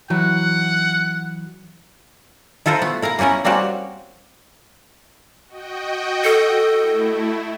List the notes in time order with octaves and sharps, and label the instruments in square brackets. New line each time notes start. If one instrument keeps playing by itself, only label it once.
[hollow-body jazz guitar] E3 F#3 [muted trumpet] F#5
[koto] E4 F4 A4 A#4 C5
A3 B3
E4 A#4 F5 A#5
A#3 B3 C#4 E4 A#4
G3 A#3 C4 C#4 F#4 G4
[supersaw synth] F#4 D#5 G5
[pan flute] A4
[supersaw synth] A3 E4